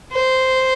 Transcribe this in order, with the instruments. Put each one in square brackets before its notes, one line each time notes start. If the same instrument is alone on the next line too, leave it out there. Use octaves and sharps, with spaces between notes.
[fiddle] C5